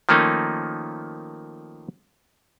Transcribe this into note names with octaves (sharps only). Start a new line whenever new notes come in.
D#3 F3 A3 A#3 C#4 D#4